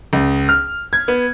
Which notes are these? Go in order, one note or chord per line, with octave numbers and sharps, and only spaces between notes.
C#2
F6
G#6
B3